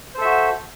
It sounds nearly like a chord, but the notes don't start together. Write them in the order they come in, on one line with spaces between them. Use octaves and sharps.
C5 A4 E5 F#4